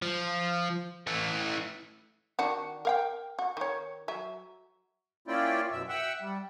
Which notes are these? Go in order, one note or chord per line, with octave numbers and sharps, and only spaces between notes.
F3
E3 A3
D#3 D4 F#4
A#4 F5 G5
F#4
D#3 C#5
F#3 E5
A#3 C#4 E4 F4 D5 G5
F#2 B2 E5
E5 F#5 G5 E6
G3